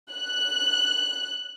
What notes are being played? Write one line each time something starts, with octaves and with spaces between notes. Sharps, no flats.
F#6